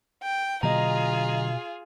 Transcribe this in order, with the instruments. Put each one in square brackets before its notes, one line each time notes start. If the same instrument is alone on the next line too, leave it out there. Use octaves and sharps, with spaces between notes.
[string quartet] G5
[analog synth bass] B2 [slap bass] D3 F#3 A#3 [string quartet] F4 G#4 [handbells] D#5 A#5